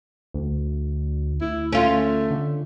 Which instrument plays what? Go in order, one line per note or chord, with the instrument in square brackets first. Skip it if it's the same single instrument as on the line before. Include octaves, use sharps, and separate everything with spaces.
[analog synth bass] D2
[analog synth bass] D2 [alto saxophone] E4
[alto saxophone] A3 [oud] C#4 F4
[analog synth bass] D3